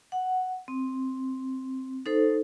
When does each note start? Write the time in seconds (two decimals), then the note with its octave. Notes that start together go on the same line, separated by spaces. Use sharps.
0.12 F#5
0.68 C4
2.06 D#4 A4 C5